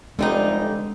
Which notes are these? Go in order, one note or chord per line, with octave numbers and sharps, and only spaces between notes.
F1 D3 G3 G#3 D4 D#4